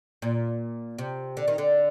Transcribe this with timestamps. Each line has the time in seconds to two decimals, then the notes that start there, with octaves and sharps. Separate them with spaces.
0.22 A#2
0.98 C3
1.37 D3
1.48 D#3
1.58 D3